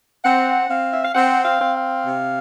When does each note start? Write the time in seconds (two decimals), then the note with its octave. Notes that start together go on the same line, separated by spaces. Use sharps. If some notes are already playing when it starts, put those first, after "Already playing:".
0.23 C4 F#5
0.69 C4 F5
0.92 E5
1.04 F5
1.14 C4 F#5
1.45 F5
1.60 C4
1.75 F5
2.06 C3